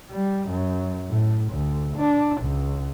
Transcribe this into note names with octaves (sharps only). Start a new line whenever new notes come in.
G3
F#2
A2
D2
D4
C#2